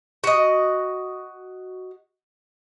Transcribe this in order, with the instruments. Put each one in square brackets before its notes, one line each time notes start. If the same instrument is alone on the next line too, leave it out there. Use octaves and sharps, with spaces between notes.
[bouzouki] F#4 D#5